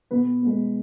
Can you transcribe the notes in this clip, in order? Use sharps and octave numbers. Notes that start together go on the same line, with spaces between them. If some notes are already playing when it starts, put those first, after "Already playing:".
B2 B3 B4
G#3 B3